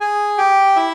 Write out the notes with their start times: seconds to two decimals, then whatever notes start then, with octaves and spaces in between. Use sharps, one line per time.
0.01 G#4 G#5
0.38 G4 G5
0.76 E4 E5